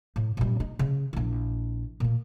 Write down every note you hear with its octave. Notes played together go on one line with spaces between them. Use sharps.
A2
G2 A#2
D#4
C#3
A#1 E4
A#2 A#3